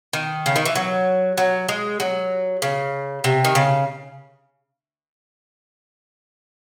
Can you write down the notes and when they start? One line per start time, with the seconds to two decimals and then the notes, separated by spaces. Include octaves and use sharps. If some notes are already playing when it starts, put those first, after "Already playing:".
0.13 D#3
0.46 C#3
0.56 D#3
0.65 E3
0.75 F#3
1.38 F#3
1.69 G#3
2.00 F#3
2.62 C#3
3.24 C3
3.45 D#3
3.55 C#3